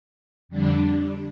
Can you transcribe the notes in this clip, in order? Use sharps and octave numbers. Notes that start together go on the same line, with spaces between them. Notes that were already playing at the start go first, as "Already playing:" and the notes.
F2 D3 G3 D4